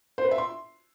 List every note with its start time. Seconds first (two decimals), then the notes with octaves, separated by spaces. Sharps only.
0.18 C5
0.25 B4
0.31 E5
0.38 C6